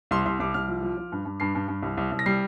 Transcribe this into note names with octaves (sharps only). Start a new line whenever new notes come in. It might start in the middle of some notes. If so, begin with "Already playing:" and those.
C2 C6
C2 C6
C2 D6
C2 F6
F3
F3
F3
G2
G2
G2 C7
G2
G2
C2
C2
C2
A#6
G3 C7